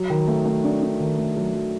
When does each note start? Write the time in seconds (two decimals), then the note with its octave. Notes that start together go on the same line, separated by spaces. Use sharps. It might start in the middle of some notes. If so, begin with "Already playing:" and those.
Already playing: F#3
0.10 D#3
0.27 A3
0.45 A3
0.64 D4
0.82 D4
1.00 D#3
1.18 A3
1.36 F#3
1.54 F#3